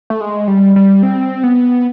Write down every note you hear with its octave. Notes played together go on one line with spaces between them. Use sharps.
A3
G#3
G3
G3
C4
B3